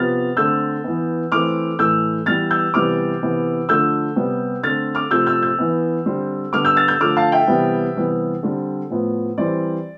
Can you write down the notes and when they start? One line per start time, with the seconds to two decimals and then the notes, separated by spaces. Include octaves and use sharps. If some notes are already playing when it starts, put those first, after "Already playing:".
Already playing: C3 F3 B3 F6 A6
0.37 D3 A3 C4 E6 G6
0.84 E3 B3
1.32 E3 A3 C4 D6 F6
1.79 A2 E3 A3 E6 G6
2.26 E3 G3 B3 F6 A6
2.51 E6 G6
2.74 C3 E3 G3 B3 D6 F6
3.22 C3 E3 B3
3.69 D3 F3 A3 E6 G6
4.16 C3 G3 B3
4.63 D3 A3 C4 F6 A6
4.95 D6 F6
5.11 C3 F3 A3 C4 E6 G6
5.27 E6 G6
5.42 E6 G6
5.59 E3 B3
6.06 D3 G3 C4
6.53 D3 G3 B3 D6 F6
6.65 E6 G6
6.76 F6 A6
6.88 E6 G6
7.00 D3 F3 A3 D6 F6
7.16 F5 A5
7.32 E5 G5
7.47 C3 E3 G3 B3
7.95 C3 E3 G3 B3
8.43 D3 G3 C4
8.90 A2 F3 B3
9.38 E3 G3 C4 D5